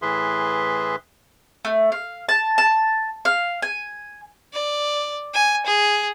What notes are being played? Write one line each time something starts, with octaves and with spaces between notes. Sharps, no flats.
A2 E3 G#4 B4 E5 C6
A3
F5
A5
A5
F5
G#5
D5
G#5
G#4